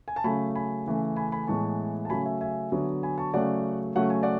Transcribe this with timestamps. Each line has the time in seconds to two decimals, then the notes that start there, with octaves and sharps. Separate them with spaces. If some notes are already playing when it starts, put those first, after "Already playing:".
0.08 G#5
0.16 A5
0.24 C#3 F#3 A3 G#5 B5
0.55 G#5 B5
0.86 C#3 E3 A3
1.16 G#5 B5
1.32 G#5 B5
1.47 A2 E3 G#3 B3 A5 C#6
2.05 A5
2.09 C#3 F#3 A3 G#5 B5
2.25 E5 G#5
2.41 E5 G#5
2.72 D3 F#3 B3
3.03 G#5 B5
3.18 A5 C#6
3.34 C#3 F#3 A3 D5 F#5
3.95 C#3 F#3 A3 F#5
4.10 G#5
4.23 D5 F#5